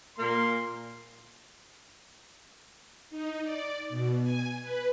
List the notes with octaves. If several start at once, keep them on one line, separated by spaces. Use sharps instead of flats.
A#2 A#3 C6
D#4
D5
B2
G#5
B4